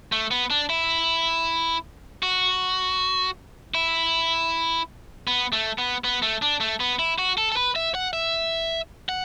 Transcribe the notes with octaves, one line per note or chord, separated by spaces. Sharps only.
A3
B3
D4
E4
F#4
E4
B3
A3
B3
B3
A3
D4
A3
B3
E4
F#4
A4
A4
B4
E5
F#5
E5
F#5